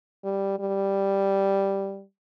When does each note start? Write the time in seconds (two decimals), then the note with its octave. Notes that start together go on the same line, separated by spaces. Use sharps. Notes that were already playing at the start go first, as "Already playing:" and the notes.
0.24 G3
0.59 G3